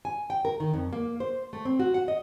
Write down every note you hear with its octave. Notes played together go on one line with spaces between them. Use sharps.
G#5
G5
A#4
D#3
F2
A#3
C5
A3
C4
F#4
F#5
D#5